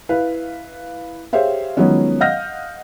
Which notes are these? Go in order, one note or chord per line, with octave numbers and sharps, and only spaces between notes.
E4 B4 F5
G4 G#4 C5 C#5 E5 F5
D#3 F3 F#3 G#3 B3 C#4
D#5 F5 F#5 F6 G6 A#6